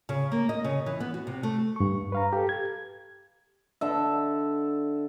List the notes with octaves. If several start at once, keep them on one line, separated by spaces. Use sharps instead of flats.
C#3
A#3
D#5
C#3
E3
B3
F#4
C3
A3
G2 C#6
B4 F5 A#5
G4 A4
G#6
D3 E5